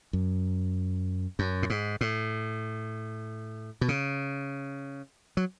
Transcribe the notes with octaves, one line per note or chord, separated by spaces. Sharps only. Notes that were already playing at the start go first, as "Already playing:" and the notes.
F#2
F#2
A2
G#2
A2
B2
C#3
F#3